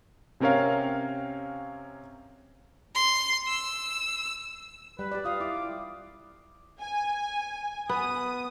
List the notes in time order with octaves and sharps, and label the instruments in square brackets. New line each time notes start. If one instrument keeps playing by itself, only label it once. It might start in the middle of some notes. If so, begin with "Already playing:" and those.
[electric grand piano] C3 C4 C#4 A#4 C#5 F5
[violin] C6
E6
[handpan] G3 [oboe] B4
[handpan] G4 D5
[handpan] F4 F5 [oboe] D#6
[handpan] E4 [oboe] D6
[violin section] G#5
[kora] B3 [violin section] D#6